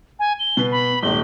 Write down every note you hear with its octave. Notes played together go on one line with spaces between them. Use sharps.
G#5
G7
B2 B4
B5
D#1 G#1 G7